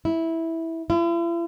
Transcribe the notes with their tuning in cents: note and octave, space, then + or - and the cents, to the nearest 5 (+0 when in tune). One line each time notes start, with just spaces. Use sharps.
E4 -10
E4 +45